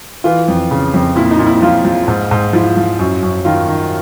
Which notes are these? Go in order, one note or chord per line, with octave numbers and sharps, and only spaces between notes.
E3 F4
F2
C#3
F2
A#2 E4
D#4
A#2
E4
F3 F4
F3
G#2
G#2
F3 E4
F3
F#2
F#2
D#3 F4
D#3